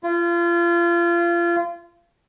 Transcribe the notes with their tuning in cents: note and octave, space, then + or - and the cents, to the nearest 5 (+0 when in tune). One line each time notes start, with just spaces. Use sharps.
F4 -30